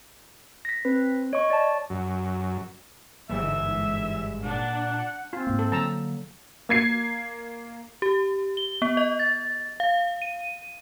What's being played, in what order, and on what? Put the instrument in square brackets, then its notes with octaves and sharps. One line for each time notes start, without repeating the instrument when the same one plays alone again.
[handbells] A#6 B6
[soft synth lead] C4 [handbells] B4
[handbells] C#5 C#6 [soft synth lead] D#5
[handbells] D5 A5
[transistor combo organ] F#2
[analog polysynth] G1 G#2 E7 [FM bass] E3 [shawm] E5
[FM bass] A#2 [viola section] D4 [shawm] F#5
[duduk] C4 [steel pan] F4
[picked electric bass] G#2 A#3
[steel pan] A4
[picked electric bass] D3 F#3 A#3 [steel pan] A5 A#5 E6
[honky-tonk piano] A#3 G#6 C7
[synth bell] G4
G7
B3
D#5
A6
F5
D#7